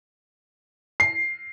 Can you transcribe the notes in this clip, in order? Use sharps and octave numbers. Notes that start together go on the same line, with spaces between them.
C7